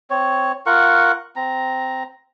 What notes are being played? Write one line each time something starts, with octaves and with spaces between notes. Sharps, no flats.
C4 C#5
F4 A#4 F#5 C#6
C4 A#5